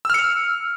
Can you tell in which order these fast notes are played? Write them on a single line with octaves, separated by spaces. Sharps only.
E6 F6 C#7